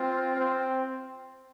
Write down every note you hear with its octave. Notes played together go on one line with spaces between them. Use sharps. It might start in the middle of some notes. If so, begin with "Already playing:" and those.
Already playing: C4 F4
C4